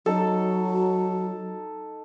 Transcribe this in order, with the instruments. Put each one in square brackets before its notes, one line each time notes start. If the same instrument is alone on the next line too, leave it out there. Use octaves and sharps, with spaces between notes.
[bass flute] F#3 [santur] D#4 A4 [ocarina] F#4